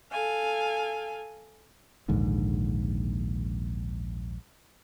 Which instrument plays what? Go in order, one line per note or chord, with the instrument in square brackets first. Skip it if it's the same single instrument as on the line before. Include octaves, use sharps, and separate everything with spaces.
[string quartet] A4 F5 G#5
[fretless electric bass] A#1 D#2 G#2 D3